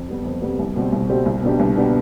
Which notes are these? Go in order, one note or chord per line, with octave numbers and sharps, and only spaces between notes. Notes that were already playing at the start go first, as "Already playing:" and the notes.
Already playing: F2
C3 G3 B3
F2
C3 G3 B3
C2
B2 G3 C4 G4
C2
B2 G3 C4 G4
C2
B2 B3 D4 G4
C2
B2 B3 D4 G4